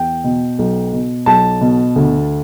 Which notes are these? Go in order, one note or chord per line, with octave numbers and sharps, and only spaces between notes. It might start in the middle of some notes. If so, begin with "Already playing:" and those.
Already playing: E2 G5
B2
B1
B2
B1 A5
B2
D2